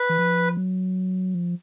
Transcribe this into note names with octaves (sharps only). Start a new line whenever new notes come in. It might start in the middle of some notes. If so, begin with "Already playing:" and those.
Already playing: B4
E3
F3
F#3
F3